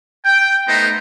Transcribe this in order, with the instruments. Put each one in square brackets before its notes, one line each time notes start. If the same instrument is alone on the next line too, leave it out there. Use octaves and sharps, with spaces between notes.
[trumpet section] G5
A3 B3 D#4 C5 A#5